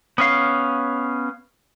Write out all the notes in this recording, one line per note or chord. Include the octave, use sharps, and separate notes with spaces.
B3 C#4 F5